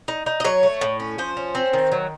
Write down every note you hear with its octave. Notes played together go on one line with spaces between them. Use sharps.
D#4
D#4
D#5
F#3 C#5
A3
A2
C#4
F3 C5
C#4
C4
D#3
F#3